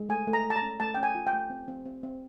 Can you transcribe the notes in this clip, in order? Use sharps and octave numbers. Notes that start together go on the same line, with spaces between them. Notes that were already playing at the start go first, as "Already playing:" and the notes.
Already playing: G#3
A3 G#5
A3
A#5
A3
A5
A#5
C#4
A3 A5
C#4 G5
G#5
F4
G5
A3
C4
C4
C4
C4